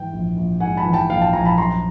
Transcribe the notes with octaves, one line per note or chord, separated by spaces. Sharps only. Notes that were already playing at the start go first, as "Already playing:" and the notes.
Already playing: G#2 E3 G5
A#1
A#1
G#2 F#5 G#5
A5 B5
E3
G5 A5
A#1 F5 G5
G5 A5
A#1 G#5 A#5
A5 B5
F#2 A#5 C6